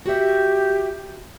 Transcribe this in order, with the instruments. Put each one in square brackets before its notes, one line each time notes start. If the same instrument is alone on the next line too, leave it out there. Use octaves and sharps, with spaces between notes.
[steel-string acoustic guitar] F#4 E5 [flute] G4